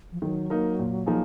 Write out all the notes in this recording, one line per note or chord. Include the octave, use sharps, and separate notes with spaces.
F3
D#3 F#3
A#3 D#4 A#4
A#2
F3 A#3 D#4 G#4